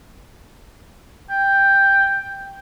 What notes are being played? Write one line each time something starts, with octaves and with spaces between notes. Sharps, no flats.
G5